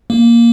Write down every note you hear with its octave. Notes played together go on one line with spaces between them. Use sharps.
A#3